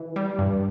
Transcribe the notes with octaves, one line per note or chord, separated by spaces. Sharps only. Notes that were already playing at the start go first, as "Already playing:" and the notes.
Already playing: E3
G3
G2